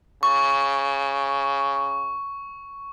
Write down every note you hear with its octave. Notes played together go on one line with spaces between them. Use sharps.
C#3 C#6